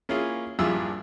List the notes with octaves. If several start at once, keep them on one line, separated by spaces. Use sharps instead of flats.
A#3 C#4 E4 F4 G#4
A#1 G2 E4 F4 G#4 E6